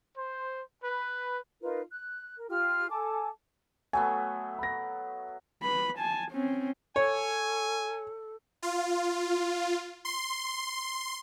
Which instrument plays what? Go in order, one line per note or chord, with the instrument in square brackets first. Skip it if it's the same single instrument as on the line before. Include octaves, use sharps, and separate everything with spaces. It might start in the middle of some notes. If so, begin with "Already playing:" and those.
[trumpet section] C5
B4
[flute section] D#4 F4 A#4 B4
F#6
A#4
F4 G4 F6
A4 G#5 A5 D6
[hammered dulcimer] F#3 A3 B3 [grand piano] G#5
[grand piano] B5 A#6
[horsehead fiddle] B4 B5
G#5 A5
C4 C#4
[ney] A4 [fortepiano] C#5 [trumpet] G#5
[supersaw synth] F4
C6